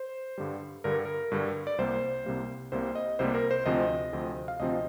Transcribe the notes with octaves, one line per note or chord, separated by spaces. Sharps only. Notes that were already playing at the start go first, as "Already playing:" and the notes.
Already playing: C5
G2 D3 G3
G2 D3 G3 A#4
A#4
G2 D3 G3
D5
C2 C3 G3 A#3 C5
C2 C3 G3 A#3
C2 C3 G3 A#3 C5
D#5
C2 C3 G3 A#3 C5
A#4
C5
D2 C3 F3 C4 D#5
D2 C3 F3 C4
F5
D2 C3 F3 C4 D#5